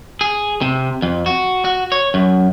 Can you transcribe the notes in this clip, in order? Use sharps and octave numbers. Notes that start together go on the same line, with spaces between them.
G#4
C3
F2
F#4
F#4
C#5
F#2